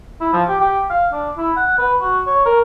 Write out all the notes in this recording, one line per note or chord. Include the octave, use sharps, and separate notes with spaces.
E4
F3
G4
G4
F5
D4
E4
F#5
B4
F#4
C#5
A#4